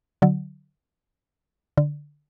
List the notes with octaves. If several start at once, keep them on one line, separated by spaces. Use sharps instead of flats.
D3 F#3
D3